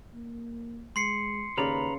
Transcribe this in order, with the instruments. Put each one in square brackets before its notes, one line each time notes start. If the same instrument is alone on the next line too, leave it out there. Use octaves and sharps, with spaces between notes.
[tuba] A#3
[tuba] G#3 [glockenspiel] C6 C7 C#7
[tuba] D#2 [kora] C#3 D5 [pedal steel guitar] B4 A#5 B5